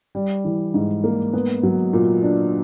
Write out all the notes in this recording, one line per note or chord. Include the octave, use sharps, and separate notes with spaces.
G3
E3
G#2
A#3
B3
F#3
A#2
D4